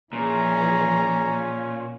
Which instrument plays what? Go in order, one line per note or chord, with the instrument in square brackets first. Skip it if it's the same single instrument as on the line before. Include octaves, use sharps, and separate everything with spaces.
[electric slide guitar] A#2 [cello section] E3 F3 G#4 [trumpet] C#4 [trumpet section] A#5